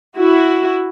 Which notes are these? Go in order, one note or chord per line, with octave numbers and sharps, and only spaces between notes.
E4 F#4